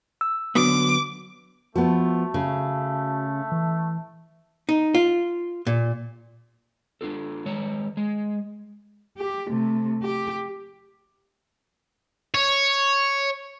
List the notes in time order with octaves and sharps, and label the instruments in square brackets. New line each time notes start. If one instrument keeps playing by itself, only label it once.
[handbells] E6
[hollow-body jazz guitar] D3 F#3 B3 [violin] D6
[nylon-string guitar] F3 B3 [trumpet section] A3 [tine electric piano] F#4
[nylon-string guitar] C#3
[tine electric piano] E3
[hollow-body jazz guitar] D#4
F4
A#2
[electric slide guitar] D4 F4 A4
D#3 G#3 C#5
G#3
[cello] G4
C3 A3
G4
[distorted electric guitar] C#5